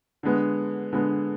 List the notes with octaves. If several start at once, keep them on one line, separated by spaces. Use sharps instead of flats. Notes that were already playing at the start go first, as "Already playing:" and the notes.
D3 G#3 B3
D3 G#3 B3